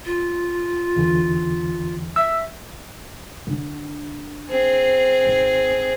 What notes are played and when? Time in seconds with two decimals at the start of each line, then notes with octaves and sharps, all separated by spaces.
0.05 F4
0.96 E2 D3 E3
2.16 E5 E6
3.47 D3 D4
4.50 C4 G#4
5.26 G#1